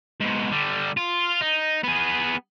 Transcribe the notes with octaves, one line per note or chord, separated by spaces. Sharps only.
G#2 B2
D3 G3
F4
D#4
B3 G#4